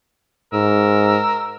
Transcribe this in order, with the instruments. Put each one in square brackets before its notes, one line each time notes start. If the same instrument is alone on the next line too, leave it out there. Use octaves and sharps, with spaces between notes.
[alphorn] G#2 [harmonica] A#4 E6